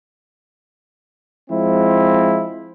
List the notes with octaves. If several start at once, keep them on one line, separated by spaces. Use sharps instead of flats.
F3 G#3 C4 E4